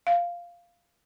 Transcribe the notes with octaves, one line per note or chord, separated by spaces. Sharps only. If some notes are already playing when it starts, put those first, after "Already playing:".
F5